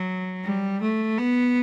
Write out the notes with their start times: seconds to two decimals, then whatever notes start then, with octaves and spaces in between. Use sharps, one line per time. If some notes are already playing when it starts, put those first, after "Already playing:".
Already playing: F#3
0.44 G3
0.81 A3
1.18 B3